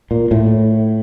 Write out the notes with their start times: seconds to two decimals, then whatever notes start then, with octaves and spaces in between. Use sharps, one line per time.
0.11 A#2
0.31 A2